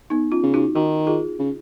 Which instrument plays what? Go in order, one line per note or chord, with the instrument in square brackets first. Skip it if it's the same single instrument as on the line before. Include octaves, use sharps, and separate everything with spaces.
[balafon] B3 D#4
C#4 F4
[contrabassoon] C#3
[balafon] D#4 F#4
[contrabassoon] D#3 [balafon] D#4 F#4
[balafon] F4 G#4
[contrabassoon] C#3